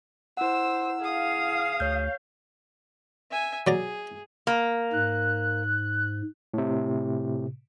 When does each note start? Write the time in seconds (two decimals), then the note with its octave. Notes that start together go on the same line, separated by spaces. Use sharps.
0.37 E4 C5 F#5 E6
1.01 G#4 F5 D#6
1.80 D2 C#5 G6
3.31 E5 G#5
3.67 F#3 G#4 D5 A#5
4.47 A#3
4.93 G#2 F#6
6.54 A2 C3